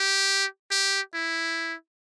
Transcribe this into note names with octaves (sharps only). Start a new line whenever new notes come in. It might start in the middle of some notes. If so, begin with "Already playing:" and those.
Already playing: G4
G4
E4